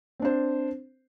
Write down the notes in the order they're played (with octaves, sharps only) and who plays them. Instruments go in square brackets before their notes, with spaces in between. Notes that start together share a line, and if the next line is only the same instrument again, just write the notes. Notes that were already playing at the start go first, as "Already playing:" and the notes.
[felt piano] C4
D4
C5